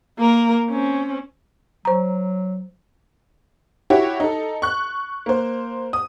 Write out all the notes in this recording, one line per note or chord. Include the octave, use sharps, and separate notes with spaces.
A#3 A#4
C4 C#4
F#3 C5 A#5
E4 F#4 G4 C#5
D#4 A4
C#6 F#6
A#3 C5
D#6